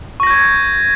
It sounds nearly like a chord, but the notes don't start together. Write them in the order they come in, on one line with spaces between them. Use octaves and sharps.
C#6 A#6 G6 G#6